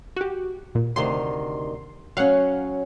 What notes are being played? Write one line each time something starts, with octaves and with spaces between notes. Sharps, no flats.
F#4 G4
A#2
D2 C3 D#3 C6
F#3 C#4 F5 F#5